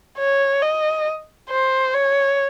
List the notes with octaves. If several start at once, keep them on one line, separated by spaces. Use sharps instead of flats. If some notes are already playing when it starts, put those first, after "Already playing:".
C#5
D#5
C5
C#5